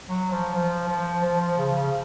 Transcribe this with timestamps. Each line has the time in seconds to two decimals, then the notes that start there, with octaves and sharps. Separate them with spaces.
0.09 F#3
0.31 F3
0.54 F3
0.89 F3
1.23 F3
1.40 F3
1.58 C#3
1.75 C#3